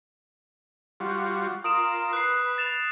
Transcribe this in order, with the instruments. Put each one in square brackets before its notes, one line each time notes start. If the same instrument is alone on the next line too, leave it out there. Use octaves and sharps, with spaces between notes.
[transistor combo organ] G3 F4 F#4
[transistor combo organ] F4 A#4 [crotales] D#6 D7 E7
[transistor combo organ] B4 [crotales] F#6 C7
[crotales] A6 E7 F7